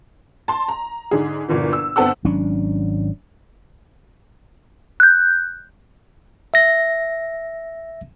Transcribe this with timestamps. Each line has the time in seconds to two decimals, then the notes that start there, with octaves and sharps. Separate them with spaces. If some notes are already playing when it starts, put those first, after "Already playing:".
0.48 A5 C6
0.68 A#5
1.11 G#2 D3 G#4
1.48 G1 A#2 D3 E3
1.73 E6
1.96 G1 B3 C4 A4 F#5 E6
2.25 G#1 F#3 C#4 D4
5.00 F#6 G6
6.54 E5 A#6